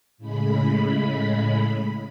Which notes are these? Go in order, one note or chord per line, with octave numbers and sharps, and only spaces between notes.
A2 C#3 G#3 B5